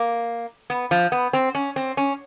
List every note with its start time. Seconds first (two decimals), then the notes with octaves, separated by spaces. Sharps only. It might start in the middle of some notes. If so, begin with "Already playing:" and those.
Already playing: A#3
0.70 B3
0.91 F3
1.12 B3
1.33 C4
1.55 C#4
1.76 C4
1.97 C#4